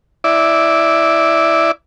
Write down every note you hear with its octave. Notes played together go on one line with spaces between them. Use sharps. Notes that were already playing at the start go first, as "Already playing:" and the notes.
E4 D5